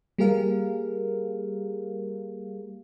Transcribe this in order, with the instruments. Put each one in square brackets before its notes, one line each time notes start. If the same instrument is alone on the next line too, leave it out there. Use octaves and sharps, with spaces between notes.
[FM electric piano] G3 A#3 G4 G#4 A#4 F5